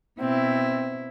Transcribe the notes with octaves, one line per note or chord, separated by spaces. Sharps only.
B2 C4 E4